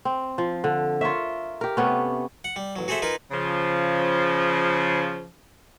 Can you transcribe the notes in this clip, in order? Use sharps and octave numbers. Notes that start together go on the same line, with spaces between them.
C4
F3
D3
F4 A#4 C#5 E5
G4 A#4
C3 A3 B3 C#4
F#5
G3
A1 F#3
F#4 G#4 A4 C5 E5
D#4 F4 A#4 B4 G#5
C#3 F3